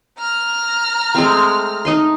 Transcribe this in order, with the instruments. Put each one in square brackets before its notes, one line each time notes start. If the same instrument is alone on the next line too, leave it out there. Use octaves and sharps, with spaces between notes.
[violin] A#5 F6
[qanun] G#3 A3 C4
D#4 D#5 C6